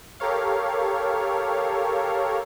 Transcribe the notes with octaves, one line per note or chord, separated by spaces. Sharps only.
G4 A4 A#4 C#5 F5